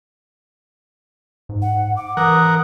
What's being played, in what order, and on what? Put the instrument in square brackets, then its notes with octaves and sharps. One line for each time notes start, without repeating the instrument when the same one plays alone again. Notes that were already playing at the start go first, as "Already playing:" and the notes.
[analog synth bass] G#2
[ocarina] F#5
D6
[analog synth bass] E3 [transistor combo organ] A#4 F#5 [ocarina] D#6